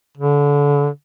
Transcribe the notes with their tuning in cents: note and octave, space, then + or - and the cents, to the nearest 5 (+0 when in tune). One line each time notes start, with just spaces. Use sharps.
D3 -30